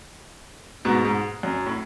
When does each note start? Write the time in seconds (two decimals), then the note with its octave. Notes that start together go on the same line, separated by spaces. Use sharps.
0.85 G#2 B2
1.05 G#2
1.43 F#2
1.66 A2